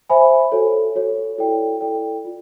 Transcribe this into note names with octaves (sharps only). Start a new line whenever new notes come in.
C5 E5 G#5 B5
F#4 A4 C#5
F#4 A4 C#5
E4 A4 D5 G5
E4 A4 D5 G5
F4